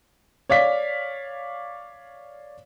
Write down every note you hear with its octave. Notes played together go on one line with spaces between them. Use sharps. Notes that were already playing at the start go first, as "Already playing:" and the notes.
C#5 D5 F5 B6